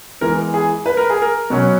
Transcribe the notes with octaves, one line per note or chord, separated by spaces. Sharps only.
E3 G#3 B3 A#4
G#4
B4
A#4
G#4
A#4
B2 F#3 C#4